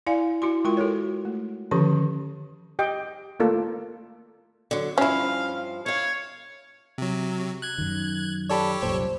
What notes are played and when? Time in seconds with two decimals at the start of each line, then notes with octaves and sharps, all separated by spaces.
0.07 E4 D5 F5 G#5
0.42 E4 F#4 C6
0.64 G#3 F4 A#4 G5 C6
0.77 F#4 A4 A#4 C#5
1.25 A3
1.71 D3 D#3 F3 C#4 G4 C#6
2.79 G4 D#5 G5
3.40 A3 A#3 F4 A4
4.71 D3 F#3
4.98 G2 F3 C#4 E4 F5
5.86 E4 C#5 F5
6.98 C3 F#3
7.62 F#6 G#6
7.78 F#2 D#3
8.50 G4 A4 C#5 D5 A5 B5
8.83 C2 F#2 A#2 C5